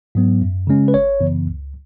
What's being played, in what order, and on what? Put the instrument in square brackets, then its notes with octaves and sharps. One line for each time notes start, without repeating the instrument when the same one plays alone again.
[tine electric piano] G#2 F#3 B3
F#2
C#3 G#3 C#4
B4
G#1 C#5
F#2 C#3 E3 B3
C#2